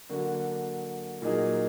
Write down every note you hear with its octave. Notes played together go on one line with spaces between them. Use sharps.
D3 F#3 A#3 D4 F#4
A#2 F#3 A#3 D#4 G#4